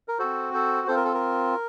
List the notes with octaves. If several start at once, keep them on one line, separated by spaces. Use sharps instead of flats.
A#4
C4 F#4 A4 C5
A4 C5
C4 F4 A4 C5
A#4
A4
A#4